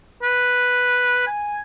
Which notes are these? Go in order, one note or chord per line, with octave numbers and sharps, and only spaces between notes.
B4
G#5